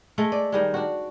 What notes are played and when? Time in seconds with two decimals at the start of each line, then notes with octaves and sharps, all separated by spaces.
0.18 G#3 A3 A4
0.32 D5
0.52 D#3 G3 G#3
0.74 D4 F#4